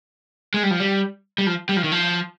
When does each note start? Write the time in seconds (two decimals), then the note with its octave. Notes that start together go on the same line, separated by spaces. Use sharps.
0.54 G#3
0.63 G3
0.71 F3
0.80 G3
1.38 G3
1.47 F3
1.69 G3
1.77 F3
1.84 D#3
1.92 F3